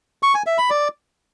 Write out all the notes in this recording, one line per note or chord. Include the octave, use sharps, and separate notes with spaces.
C#6
G#5
E5
B5
D5